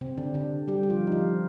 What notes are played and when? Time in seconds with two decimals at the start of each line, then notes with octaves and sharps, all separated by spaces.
0.01 C3 C4
0.17 D3 D4
0.34 D3 D4
0.68 G3 G4
0.83 G4
0.90 F3 F4
1.07 D#4
1.12 F3 F4